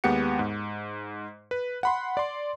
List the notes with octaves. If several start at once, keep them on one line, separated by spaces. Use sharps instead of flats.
D#2 G#3 B3 G4 F#5 C#7
G#2
B4
F#5 B5 C6
D5 C6